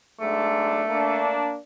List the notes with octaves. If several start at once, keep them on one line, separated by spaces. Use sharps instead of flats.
B1 G#2 A3 D4
A#3 D4